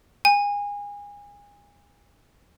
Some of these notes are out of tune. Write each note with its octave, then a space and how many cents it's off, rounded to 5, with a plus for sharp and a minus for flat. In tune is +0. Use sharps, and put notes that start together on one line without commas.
G#5 -30